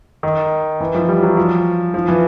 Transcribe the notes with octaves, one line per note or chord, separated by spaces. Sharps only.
D#3
E3
F3
G3
F#3
F3
F3
E3